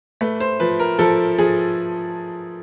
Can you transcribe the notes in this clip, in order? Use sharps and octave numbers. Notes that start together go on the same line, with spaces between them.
A3 B4
C5
F3 B4
A#4
F3 A4
F3 G#4